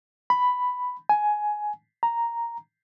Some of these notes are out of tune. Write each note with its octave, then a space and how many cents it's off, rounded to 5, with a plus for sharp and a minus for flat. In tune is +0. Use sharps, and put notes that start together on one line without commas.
B5 +5
G#5 +15
A#5 +0